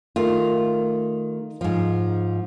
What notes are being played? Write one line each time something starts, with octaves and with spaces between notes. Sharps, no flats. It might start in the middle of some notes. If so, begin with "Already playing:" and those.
D#3 A3 F4
G#2 F3